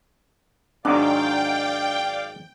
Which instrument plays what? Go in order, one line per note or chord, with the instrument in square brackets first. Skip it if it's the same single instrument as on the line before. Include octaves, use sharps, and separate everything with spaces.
[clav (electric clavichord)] G#2 D#3 F#3 [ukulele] D4 [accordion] D5 F5 D6 [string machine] G5